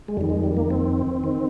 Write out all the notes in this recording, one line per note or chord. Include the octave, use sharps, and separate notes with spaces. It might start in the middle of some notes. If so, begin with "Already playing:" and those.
G#3
F2 D#3 G3
G#3
G3
A#3
C4
D#3